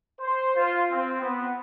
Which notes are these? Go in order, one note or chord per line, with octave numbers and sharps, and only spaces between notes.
C5
F4
C4
B3